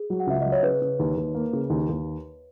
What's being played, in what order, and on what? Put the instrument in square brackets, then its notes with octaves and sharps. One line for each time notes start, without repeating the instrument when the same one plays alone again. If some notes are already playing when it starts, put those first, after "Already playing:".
Already playing: [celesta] G#4
[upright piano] F#3
[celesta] F#5
[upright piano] C#2 [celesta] E5
[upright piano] F#3 [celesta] D#5
[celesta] C#5
[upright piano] C#3 [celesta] B4
[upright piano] C#3
D#2
D#2
A#3
C#3
D#2
D#2